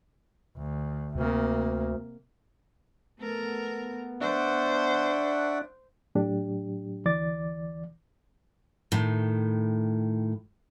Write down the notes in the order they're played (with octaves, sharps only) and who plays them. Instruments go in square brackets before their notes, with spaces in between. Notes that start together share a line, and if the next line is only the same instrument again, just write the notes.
[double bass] D2
[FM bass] D2 [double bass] C3 A#3
[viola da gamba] A3 A#4 [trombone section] B3
[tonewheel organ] D4 [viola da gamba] C5 [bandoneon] E5 F#5 C#6
[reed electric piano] A2 F#3 D4 G4
D2 E3 D5 D6 A6
[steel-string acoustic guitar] A2 D#3